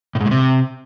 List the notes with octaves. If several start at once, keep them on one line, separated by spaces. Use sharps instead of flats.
A2
G#2
A2
C3